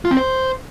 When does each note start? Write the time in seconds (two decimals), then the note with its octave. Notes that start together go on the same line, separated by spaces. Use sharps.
0.05 F4
0.11 C4
0.17 C5